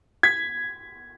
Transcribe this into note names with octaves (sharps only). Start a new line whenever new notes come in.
G#6 B6